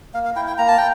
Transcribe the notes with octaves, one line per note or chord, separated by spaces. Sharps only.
A#3 F5
F5
E4 G5
G5
A#3 A#5
A5
G5